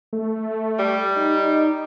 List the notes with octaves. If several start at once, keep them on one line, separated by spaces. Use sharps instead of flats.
A3
G3
D#4